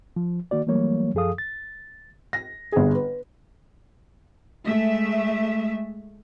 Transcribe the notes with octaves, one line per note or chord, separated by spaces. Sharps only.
F3
D#3 A#3 F#4 D5
E3 F#3 G3 A3 A#3 C#5
F#2 F3 G#4 A4 F5 D#6
A6
A#6
G1 G#4
B4
G#3 A3 E5